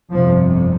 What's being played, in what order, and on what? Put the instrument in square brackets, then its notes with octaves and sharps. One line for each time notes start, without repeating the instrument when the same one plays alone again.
[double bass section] G1 F2 C3 F3